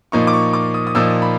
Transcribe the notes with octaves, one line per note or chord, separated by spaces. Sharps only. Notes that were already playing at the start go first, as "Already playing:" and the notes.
A#2 F3 A#3 D#4 C#6
D6
C#6
D6
D#6
D#6
A#2 F3 A#3 D#4 E6
B5